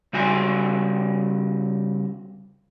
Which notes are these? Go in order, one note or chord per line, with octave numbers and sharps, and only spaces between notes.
C#3 G3 F#4 G#5